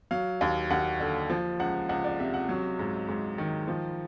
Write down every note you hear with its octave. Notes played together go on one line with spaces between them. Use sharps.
F#3 F5
D#2
D#2 F#5
D3
F3
C#2 F#5
C#2 F#5
D5
C3 E5
F#5
F#3
G#2
G#2
D#3
F3